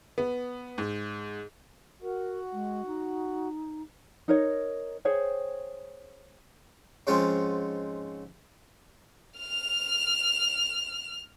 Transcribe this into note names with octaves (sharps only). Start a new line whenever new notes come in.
B3
G#2
F#4 A#4
G#3
D#4
D#4 A#4 C#5
G#4 C5 C#5 G5
G#2 C#3 F3 G#3 C4 C#4
F6 F7